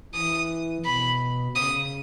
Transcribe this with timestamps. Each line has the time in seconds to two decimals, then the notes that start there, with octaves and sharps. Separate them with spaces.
0.13 E3 D#6
0.84 B2 B5
1.55 C#3 D#6